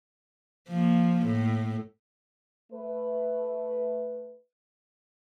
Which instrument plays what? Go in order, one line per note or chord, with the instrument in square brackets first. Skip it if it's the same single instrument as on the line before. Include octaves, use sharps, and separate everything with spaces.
[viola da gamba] F3 A#3
A2
[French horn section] A3 B4